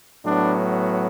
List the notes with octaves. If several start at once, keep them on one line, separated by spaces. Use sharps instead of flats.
A2 F#3 B3 D4